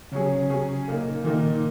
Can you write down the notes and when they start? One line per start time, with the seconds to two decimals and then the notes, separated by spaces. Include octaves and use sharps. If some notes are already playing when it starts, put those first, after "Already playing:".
0.12 C#3 F#3 C#4 G#4
0.30 C#3
0.49 F#3 C#4 G#4
0.88 A#2 A#3 D#4
1.25 A#2 D#3 A#3 D#4